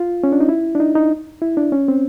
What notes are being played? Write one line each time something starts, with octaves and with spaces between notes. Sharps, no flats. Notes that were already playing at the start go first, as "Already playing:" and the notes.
Already playing: F4
C#4
D4
D#4
E4
D4
D#4
D#4
E4
D4
C#4
C4